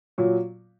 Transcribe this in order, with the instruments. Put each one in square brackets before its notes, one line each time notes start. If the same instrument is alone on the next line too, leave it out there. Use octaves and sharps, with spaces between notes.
[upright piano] A#2 F#3